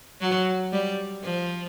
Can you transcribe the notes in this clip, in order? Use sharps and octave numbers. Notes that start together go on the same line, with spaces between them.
F#3
G3
F3